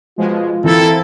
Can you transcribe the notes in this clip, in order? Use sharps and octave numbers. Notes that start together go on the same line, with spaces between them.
B2 F3 G#3 F4
E3 A#3 C4 E4 A4 E5 A6